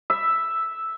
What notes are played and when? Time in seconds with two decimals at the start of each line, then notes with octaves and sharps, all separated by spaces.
0.10 E5